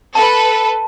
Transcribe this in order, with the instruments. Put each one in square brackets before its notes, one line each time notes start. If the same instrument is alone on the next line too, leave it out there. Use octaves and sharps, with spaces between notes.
[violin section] A4 B4 [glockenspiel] A5